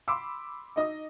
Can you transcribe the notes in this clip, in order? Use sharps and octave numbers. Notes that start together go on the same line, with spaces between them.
B5 C6 D6 E6
D#4 D#5 D#6